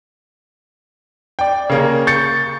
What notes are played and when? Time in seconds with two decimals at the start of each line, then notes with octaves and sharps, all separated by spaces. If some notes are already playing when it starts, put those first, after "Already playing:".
1.39 D5 G5
1.69 C#3 A#3 A#4
2.07 C#6 G6 A6 C#7